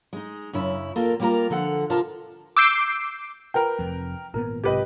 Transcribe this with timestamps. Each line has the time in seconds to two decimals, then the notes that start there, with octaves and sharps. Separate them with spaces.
0.13 G#3 D#4
0.53 F#2 C#3 E4
0.96 A#3 F4 A4 A#4
1.20 G3 A#3 E4 F4 A#4 A#5
1.50 D3 F3 A4 F#5
1.90 C3 F4 A#4 A5
2.57 D6 E6 G6 C7 D7
3.54 A#4 B4 G5
3.79 F1 F2
4.34 G#1 A#2 B3 A#4
4.64 B1 G#2 C3 G4 B4 D#5